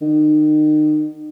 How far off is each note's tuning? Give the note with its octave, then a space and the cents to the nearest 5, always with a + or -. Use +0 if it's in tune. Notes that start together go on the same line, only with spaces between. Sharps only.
D#3 -35